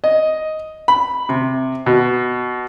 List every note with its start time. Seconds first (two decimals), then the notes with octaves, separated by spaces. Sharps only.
0.04 D#5
0.88 B5
1.29 C3
1.86 B2